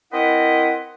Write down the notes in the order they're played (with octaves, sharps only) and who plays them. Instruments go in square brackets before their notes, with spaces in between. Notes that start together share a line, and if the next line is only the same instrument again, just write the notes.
[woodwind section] C4 E4 A#4 B4 D#5 F#5